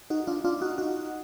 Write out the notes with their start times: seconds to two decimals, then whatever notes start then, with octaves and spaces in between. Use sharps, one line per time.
0.10 D#4 F#4
0.27 D4 F4
0.44 D4 F4
0.61 D#4 F#4
0.78 D#4 F#4